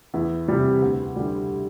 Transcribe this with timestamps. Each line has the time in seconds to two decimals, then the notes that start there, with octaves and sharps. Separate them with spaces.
0.14 E2 E4
0.48 C3 G3
0.82 D2
1.16 D3 G3